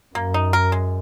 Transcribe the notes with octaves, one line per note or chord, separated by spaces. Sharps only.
F#2 A#3
D#4
A#4
G#3